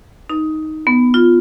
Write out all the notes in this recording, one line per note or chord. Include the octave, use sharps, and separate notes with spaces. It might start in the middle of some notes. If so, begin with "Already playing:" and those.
D#4
B3
F4